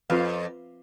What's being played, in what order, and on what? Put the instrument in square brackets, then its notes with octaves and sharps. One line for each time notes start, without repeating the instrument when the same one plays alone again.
[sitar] F2 [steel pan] F4 B4 F5